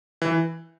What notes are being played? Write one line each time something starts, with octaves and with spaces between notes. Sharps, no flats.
E3